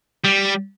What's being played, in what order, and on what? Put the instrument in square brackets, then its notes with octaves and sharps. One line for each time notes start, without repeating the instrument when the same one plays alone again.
[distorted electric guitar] G3